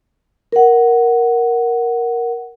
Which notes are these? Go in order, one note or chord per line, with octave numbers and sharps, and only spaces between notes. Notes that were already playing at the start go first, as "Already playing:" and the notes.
A#4 F#5